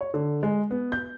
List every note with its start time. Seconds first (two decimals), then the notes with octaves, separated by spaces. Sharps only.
0.01 C#5
0.14 D3
0.43 G#3
0.71 B3
0.92 G6